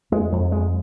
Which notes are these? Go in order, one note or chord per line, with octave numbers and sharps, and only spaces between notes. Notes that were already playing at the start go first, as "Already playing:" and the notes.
F2 G#3
F2
F2 G#3